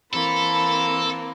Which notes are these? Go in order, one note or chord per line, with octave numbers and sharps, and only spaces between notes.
E3 A#3 C4 A4 B5